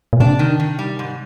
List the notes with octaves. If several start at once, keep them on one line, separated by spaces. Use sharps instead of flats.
A#2
C3 D4
D#3
D#3
G3
G#2